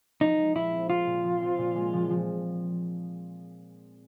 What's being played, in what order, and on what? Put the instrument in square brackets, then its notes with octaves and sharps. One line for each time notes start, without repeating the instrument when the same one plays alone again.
[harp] F3 [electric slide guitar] D#4
[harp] G#3
[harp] A#2 [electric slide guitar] E4
[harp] C4
[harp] C4 [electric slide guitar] F4
[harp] A#2
F3
C4
A#2
G#3
F3
F3